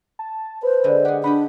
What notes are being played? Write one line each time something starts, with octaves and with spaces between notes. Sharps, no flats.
A5
B4 C5
D3 G#3
G4 G#4 F#5
D4 G4 D#5 F#5 B5